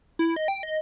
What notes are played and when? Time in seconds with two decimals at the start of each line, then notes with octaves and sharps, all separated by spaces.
0.19 E4
0.36 D#5
0.48 G5
0.63 D#5